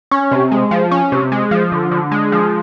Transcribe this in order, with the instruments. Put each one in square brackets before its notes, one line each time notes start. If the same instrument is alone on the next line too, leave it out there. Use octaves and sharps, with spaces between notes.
[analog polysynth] C#4
C3
G#3
F3
C#4
C3
G#3
F3
D3
D3
G#3
F3